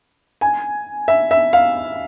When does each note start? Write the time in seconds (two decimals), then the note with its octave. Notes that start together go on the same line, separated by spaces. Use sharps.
0.41 G#5
1.08 E5
1.31 E5
1.53 F5